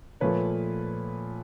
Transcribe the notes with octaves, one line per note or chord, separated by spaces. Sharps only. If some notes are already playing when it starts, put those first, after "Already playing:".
A#2 F3 A3 B4 C#5